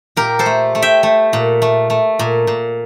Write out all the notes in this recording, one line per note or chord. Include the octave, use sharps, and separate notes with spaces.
A#2 G4 A#4
A4 C5
A3
A3
E5 G5
A3
A#2
A3
A3
A#2
A#2